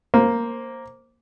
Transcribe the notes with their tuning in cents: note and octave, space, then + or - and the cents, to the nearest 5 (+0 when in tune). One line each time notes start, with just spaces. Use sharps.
A#3 +0 C5 +15